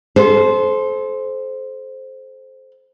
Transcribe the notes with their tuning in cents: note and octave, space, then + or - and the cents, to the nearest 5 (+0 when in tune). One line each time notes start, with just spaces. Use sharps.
A4 -35 C5 +0